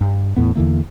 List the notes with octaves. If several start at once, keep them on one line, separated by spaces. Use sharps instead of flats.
G2
E2 A2 B3
E2 D3 E3 A#3